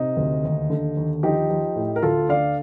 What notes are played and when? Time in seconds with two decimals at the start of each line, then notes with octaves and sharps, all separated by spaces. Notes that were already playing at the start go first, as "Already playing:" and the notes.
Already playing: C3 D#4
0.17 D2
0.44 D#2
0.70 D3
0.97 D#2
1.23 F3 D#4 G4
1.50 F3
1.76 A2
1.96 A#4
2.02 D2 F4 A4
2.29 D3 D5 F5